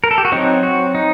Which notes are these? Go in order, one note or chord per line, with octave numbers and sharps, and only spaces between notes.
A#4
A4
G4
F#4
F#3 C4 D#4
F#4
D#4